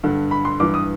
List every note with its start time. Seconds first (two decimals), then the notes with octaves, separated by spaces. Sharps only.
0.03 G2 D3
0.31 B5
0.45 C6
0.60 G2 E3 D6
0.74 D#6